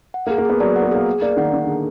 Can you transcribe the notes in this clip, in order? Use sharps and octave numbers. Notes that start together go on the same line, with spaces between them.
F#5
A#3
G#4
A#3
B3 G#4
F#3 D5
F#5
B3
A#3 G#4
G#4
A#3 D5
D#3 F#5
D#3 G#4
D3
G#4